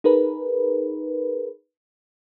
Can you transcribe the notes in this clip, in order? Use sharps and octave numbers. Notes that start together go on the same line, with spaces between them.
D#4 G#4 A#4 B4